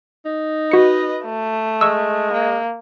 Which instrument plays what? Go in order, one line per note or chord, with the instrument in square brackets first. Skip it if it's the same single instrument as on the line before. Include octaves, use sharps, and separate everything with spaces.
[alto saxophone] D#4
[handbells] F#4 C#7 [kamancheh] B4 D#5
[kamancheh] A3
[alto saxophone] G#3 [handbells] C#6 E6
[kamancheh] A#3